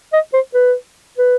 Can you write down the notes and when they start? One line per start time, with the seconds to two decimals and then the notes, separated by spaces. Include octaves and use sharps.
0.13 D#5
0.34 C5
0.54 B4
1.18 B4